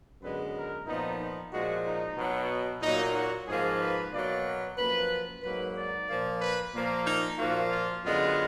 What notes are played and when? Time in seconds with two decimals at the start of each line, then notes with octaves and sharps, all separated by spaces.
0.21 F#2 D3 G#3 B3 B4
0.54 A#4
0.87 A#2 F3 B3 D#4
1.20 D#4
1.52 A#2 F3 G#3 F#4
1.85 D#4
2.17 B2 F#3 B3
2.82 A#2 F#3 A#3 D#4
3.14 F#4
3.48 G#2 F3 A#3 G#4
3.80 B4
4.12 B2 F#3 A#3 D5
4.45 B4
4.77 F#2 F3 A#3 B4
5.43 G#2 F#3 A#3 B4
5.76 D5
6.08 A#2 F3 A#3
6.41 B4
6.74 A#2 F3 A#3
7.06 D#4
7.38 A#2 F3 A#3 F#4
7.71 F4
8.04 F#2 D3 G#3 B3 F4